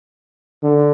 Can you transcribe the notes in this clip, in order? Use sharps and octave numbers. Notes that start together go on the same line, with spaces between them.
D3